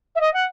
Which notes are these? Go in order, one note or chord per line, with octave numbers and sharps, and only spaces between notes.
E5
D#5
F#5